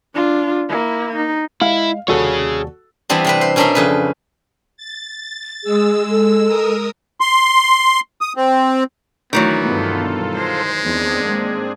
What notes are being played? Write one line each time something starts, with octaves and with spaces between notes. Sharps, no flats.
D4 F4
A#3 E4
D#4
G#3 E4 F5
D#2 C3 G3 F#4 G#4 A4 C#5
E3 G3 B3 C4 D4
C3 C4 B4
C5
B2 C#4 D4 A#4 E5 C6
F2 C#3 B4
A6
G#3 G#4 E6
A4
A#4 D#6
C6
D#6
C4
D2 D#3 E3 F#3 B3
G2 B2 F4 A4
G#3 C5
E2 C4 D4 G#4
G#2 A#3